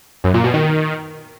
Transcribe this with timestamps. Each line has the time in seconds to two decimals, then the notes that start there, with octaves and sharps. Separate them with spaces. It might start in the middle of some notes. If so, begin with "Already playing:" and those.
0.24 F#2
0.34 A#2
0.44 B2
0.54 D#3